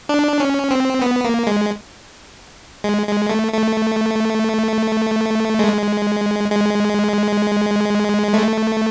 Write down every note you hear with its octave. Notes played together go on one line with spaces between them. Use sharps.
D4
C#4
C4
B3
A#3
G#3
G#3
G#3
A3
A3
G#3
G#3
A3